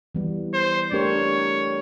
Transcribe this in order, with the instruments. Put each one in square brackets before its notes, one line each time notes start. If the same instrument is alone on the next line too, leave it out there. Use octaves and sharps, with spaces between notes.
[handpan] E3 G3 B3
[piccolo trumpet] C5
[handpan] A3 D4 G4 A#4 [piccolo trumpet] C#5